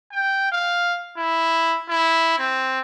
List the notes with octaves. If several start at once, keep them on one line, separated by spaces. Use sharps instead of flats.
G5
F5
E4
E4
C4